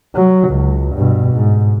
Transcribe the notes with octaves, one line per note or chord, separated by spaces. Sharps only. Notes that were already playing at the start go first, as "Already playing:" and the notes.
F#3
C#2
G2 B2
G#2